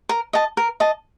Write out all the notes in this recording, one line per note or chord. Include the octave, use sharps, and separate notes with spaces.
A#4
D#5 A5
A#4
D#5 A5